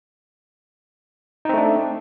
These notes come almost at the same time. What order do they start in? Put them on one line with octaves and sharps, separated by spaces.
D#4 C4 A3 D4